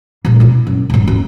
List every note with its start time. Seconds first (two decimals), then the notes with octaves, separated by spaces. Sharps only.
0.25 D#1 A#2
0.40 B2 E4
0.67 F#2
0.90 D#1 G#2
1.07 F#2